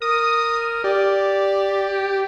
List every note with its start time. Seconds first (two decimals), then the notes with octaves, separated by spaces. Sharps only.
0.02 A#4 D#6
0.84 G4 D5